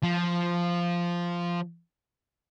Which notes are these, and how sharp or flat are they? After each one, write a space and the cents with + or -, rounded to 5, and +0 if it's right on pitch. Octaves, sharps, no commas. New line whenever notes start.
F3 -5